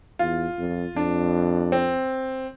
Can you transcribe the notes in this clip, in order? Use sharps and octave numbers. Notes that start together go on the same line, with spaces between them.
E2 F4
F2
F2 D4
C4